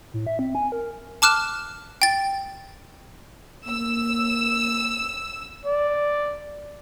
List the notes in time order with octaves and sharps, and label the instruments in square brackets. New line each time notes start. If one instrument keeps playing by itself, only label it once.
[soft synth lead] A2
E5
C4
G#5
A#4
[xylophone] A5 D6 F6 F#6 E7
G5 A6
[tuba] A#3 [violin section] E6
[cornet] D5